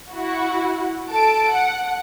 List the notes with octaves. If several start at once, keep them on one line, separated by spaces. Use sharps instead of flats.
E4 F#4
A4 A5 D7
F#5